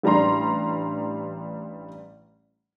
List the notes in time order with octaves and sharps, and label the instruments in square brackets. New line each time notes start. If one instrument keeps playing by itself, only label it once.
[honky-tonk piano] A1 G3 D4 A#5 C6